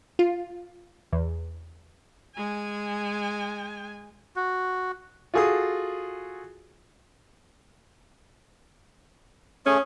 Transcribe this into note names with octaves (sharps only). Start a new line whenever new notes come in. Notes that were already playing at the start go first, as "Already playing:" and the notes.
F4
E2
G#3 G#5
F#4
F4 F#4 G#4 A4 D#6
A3 C#4 G#4